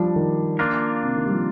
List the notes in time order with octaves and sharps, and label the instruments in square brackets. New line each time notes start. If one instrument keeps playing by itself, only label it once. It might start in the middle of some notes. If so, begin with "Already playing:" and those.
Already playing: [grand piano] F3 [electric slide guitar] G3 D4
[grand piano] D#3
[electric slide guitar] A#3 D4 F4 A#4
[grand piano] C3
D#3
G3
F3